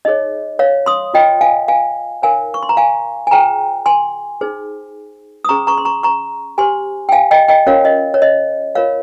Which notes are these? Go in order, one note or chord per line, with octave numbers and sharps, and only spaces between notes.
D#4 G#4 C#5 D#5
C#5 F5
C6 D#6
F4 C5 D#5 G5
F5 G#5
F5 G#5
D#4 A#4 C#5 F5 G#5
C#6
C6
A#5
F5 G#5
G#5
F4 G#4 C5 G5 A#5
G#5 C6
D#4 G#4 C5
D#6
C#4 G#4 C5 A#5 C#6
A#5 C#6
C6
A#5 C#6
A#5 C#6
G4 C5 G#5 C6
G5
F5 G#5
D#5 G5
D#5 G5
C#4 F4 A#4 C#5 F5
D#5
C#5
D#5
F4 A#4 C#5 F5